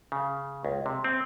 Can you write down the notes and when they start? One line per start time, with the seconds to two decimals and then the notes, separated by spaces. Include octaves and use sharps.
0.12 C#3
0.65 C#2
0.86 C3
1.04 C4